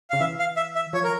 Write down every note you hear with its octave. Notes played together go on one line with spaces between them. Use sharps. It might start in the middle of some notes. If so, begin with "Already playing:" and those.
C#3 F5
E3 E5
F5
E5
E5
F3 C#5
A#4